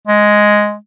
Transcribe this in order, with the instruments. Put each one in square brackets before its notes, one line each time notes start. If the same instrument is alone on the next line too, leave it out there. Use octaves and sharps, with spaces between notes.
[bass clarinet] G#3